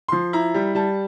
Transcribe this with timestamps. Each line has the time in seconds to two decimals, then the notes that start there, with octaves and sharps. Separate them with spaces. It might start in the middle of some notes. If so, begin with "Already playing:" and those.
0.08 F3 C6
0.33 E4 A#5
0.54 G3
0.75 G3 A5